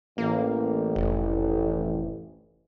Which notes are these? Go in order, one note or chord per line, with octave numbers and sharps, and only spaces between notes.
A1 A#3
F1